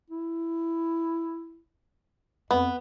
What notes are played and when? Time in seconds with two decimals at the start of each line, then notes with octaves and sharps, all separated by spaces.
0.10 E4
2.51 F2 B3